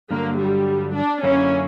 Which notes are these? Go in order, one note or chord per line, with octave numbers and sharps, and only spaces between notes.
G2 D3 F#3 A#3
G3
D4
F#2 D3 A#3 C#4 E4